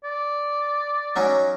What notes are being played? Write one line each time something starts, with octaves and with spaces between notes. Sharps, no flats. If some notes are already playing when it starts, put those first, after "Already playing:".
D5
F#3 C#4 D#4